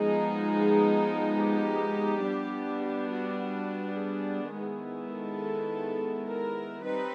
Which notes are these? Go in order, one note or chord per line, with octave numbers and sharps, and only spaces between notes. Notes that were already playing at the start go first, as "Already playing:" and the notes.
Already playing: F3 G#3 B3 D#4 G#4
G4
G3 B3 D4
G4
F#4
F#4
G#4
D#3 G#3 B3 E4
A4
A#4
G3 C4 D#4 B4